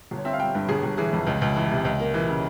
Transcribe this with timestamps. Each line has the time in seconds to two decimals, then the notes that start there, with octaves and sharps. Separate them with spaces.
0.11 G1
0.18 C#5
0.25 C4 E5
0.33 F5
0.39 G3 G5
0.55 G2
0.68 G1 G#4
0.83 G1
0.97 E3 G#4
1.13 F2
1.27 C#2
1.42 C#2
1.56 E3
1.71 C3
1.85 C#2
2.00 A#3
2.14 E3
2.28 C#3